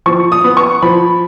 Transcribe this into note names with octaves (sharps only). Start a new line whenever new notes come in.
F3 C#6
D#6
B3
C#6
F3 B5